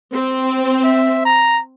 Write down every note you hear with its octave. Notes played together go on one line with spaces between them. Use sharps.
C4
E5
A#5